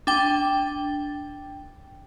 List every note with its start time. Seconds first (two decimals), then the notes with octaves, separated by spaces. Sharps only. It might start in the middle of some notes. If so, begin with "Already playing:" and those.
0.07 D4 G5